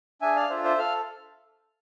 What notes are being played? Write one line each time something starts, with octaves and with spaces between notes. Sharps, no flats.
D4 G#4 E5 G#5
D5 F5
D4 F4 A4 C5 E5
C5 E5
A4 F5